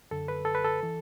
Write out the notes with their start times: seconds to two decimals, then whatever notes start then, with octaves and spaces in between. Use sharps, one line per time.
0.11 F#2 D3 A4
0.28 B4
0.45 A4
0.55 B4
0.65 A4
0.83 E3